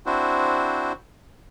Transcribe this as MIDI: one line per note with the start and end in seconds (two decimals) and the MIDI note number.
0.06 0.92 60
0.06 0.92 62
0.06 0.92 64
0.06 0.92 66
0.06 0.92 72